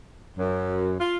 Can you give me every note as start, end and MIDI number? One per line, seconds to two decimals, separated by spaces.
0.38 0.94 42
1.00 1.18 65